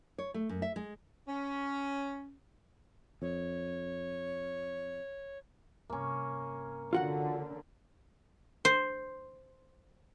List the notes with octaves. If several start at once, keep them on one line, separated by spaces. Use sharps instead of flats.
C#5
A3
F#2
E5
G#3
C#4
F2 C#5
G2 C3 A#3 C#4
D3 F4 F#4 F#5
C5